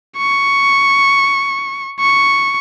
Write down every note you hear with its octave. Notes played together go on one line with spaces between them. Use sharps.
C#6
C#6